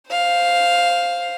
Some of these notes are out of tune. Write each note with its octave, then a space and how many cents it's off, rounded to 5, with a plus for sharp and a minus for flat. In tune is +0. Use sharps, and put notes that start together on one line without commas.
C5 -5 F5 +0